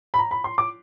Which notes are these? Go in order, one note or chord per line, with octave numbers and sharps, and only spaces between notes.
B5
A#5
B5
C6
D6